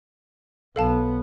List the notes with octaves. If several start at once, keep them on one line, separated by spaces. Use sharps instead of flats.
B1 B3 A4 F5 A5